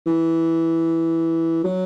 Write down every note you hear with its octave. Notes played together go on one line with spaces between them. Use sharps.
E3
F#3